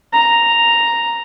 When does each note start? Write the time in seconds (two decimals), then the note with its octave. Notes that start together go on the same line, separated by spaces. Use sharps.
0.13 A#5